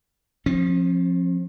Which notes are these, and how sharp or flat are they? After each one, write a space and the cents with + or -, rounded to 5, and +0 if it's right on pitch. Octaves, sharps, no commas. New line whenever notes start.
F3 +10 C4 +45